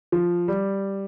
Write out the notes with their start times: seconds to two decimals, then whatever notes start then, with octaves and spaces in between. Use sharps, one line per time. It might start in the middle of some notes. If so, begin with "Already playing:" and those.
0.12 F3
0.48 G3